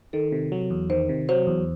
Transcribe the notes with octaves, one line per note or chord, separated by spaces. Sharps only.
D#3 A4
C3
F#3
E2
D#3 C5
C3
F#3 C5
E2